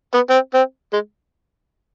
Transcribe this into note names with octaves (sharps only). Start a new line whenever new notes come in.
B3
C4
C4
G#3